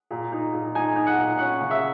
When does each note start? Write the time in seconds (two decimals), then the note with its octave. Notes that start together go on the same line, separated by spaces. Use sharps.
0.11 A#2
0.32 D#4
0.54 A#2
0.75 D#4 G#5
0.96 D#4
1.07 F#5
1.18 A#2
1.39 C#4 F#5
1.60 C#3
1.71 E5